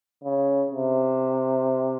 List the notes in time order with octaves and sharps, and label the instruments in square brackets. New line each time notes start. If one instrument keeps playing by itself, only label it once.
[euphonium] C#3
C3